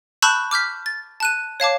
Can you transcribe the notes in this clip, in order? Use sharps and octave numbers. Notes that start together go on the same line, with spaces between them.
A5 B5 C#6 E6 F#6 G6
D6 F6 G6 B6
A6
A5 F#6 D#7
C#5 F5 A5 D6